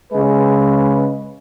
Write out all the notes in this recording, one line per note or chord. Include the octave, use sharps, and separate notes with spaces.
C#3 G#3 B4